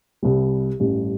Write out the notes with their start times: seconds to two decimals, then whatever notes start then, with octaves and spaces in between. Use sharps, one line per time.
0.23 C2 C3 G3
0.80 A1 G2 G3